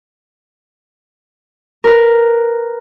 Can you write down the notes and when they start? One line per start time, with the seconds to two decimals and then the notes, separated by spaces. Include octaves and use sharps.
1.84 A#4 B4